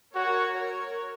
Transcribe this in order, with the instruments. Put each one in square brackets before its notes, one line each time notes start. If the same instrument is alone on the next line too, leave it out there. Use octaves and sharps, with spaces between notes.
[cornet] F#4 [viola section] A#4 C#5
[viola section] A#4 C#5